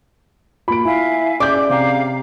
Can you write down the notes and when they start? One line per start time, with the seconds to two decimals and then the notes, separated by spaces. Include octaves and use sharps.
0.68 A#3 F4 B5 D7
0.85 E4 E5 F5 G#5
1.40 C#4 G#4 D5 D6 G6
1.70 C3 F5 A#5